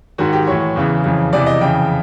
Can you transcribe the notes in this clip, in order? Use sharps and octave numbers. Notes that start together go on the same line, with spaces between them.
G#2 D#3 F#4
G4
A2 E3 C#5
E2 C#3 E3
F2 C#3 E3
E2 C3 E3 D5
D#5
F2 C#3 E3 G5